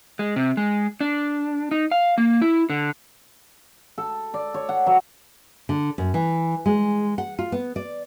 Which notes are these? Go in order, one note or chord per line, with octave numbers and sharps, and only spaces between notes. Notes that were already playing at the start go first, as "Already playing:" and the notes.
G#3
C3
G#3
D4
D#4
F5
A#3
E4
D3
A4
D5
C#5
F#5
F#3
D3
F#2
E3
G#3
F#5
F4
B3
D5